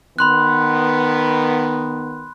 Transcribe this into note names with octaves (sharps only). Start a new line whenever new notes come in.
D#3 B3 B5 C6 F#6